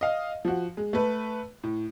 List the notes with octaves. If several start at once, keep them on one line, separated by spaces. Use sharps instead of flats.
D#5 F5
F3 F#4
G#3
A3 B4
A2